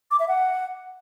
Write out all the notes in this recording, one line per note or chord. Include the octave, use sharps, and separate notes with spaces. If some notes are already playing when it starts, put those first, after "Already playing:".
D6
E5
F#5